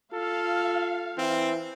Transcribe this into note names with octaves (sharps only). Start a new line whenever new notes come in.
F4 A4 F5
E3 C4